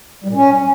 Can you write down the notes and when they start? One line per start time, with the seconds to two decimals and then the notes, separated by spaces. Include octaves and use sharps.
0.24 G3
0.29 A#2
0.34 C#4